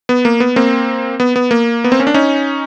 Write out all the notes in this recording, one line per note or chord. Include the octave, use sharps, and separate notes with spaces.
B3
A#3
B3
A#3 C4
B3
B3
A#3
B3
C4
C#4
D4
C#4 D#4